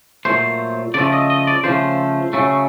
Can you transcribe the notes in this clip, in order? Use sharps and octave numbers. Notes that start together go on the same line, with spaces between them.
A#2 F#3 A3 C5
C#3 F3 A3 D5
D#5
D#5
D5
C#3 F3 A3 C5
C#3 F#3 A3